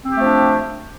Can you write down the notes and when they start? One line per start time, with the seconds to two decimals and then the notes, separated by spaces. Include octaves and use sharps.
0.05 C4
0.10 G4
0.15 A3
0.20 F3
0.25 D4